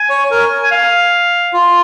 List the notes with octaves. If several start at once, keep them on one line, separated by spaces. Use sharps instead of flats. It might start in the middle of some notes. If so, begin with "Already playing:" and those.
Already playing: G#5
C#5
A#4
G#5
F5
F4